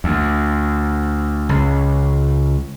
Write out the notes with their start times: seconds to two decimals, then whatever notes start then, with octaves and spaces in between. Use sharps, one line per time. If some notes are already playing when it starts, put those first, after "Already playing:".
0.04 D2
1.49 C#2